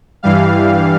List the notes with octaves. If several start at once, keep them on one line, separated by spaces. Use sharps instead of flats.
G2 E3 G3 F5